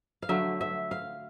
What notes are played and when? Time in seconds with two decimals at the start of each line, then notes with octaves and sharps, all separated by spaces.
0.22 F5
0.29 D3 F#3 A3 E5
0.61 E5
0.91 F5